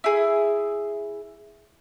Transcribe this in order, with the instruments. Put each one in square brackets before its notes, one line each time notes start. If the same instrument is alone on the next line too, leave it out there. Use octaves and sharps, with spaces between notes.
[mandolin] E4 G#4